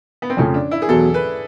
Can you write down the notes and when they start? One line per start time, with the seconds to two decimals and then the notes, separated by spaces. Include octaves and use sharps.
0.22 B3
0.30 C4
0.37 F2 C#3 F3 A3 C#4
0.54 D4
0.71 E4
0.82 G#4
0.88 E2 B2 F#3 A4
1.14 B4